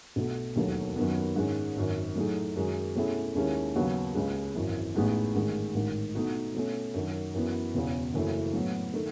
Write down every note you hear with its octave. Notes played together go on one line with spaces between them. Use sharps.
B1 B2 A3
E1 D#2 D#3 F#3 A3
F#2 D#3 F#3 B3
G#2 D#3 G#3 C#4
G#1 F#2 D#3
A2 F#3 A3 D#4 G#4
F#2 D#3 G#3 D#4 F#4
B2 A3 C#4 E4 G#4
D#2 D#3 G#3 C#4 E4
D#2 C#3 F#3 B3 F#4
C#2 C#3 G#3
G#1 F#2 E3
A1 A2 G#3 B3 D#4
A1 G#2 D#3 G#3
A1 G#2 D#3
B2 A3 D#4 F#4
B2 A3 C#4
F#2 D#3 F#3
F#2 E3 B3
E1 E2 C#3
F#1 F#2 E3 A3 E4
A2 F#3 B3
D#3 A3